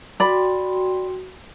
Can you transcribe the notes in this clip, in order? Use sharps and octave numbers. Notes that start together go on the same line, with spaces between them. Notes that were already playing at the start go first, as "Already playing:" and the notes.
F#4 D5 G5 B5 C6